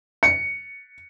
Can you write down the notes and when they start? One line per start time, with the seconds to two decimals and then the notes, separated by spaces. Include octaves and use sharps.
0.23 C#7